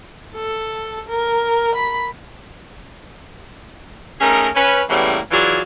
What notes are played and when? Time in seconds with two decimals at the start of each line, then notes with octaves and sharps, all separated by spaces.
0.35 A4
1.08 A#4
1.75 B5
4.21 A3 C#4 D#4 G#4 A#4
4.55 C#4 B4
4.88 A2 C#3 E3 G3 A#3 B3
5.31 E3 F#3 F4 G#4 D5